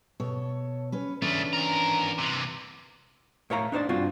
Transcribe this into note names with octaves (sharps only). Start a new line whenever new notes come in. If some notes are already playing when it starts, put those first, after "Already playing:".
B2 A4 C#5
C#4 B4
C#3 E3 A3 C#4 D4
G#2 A#4
C3 E3
A2 A#4 C#5 E5 F5 A#5
D4 D#4 C5 D5
G2 C4 D4 F4 F#4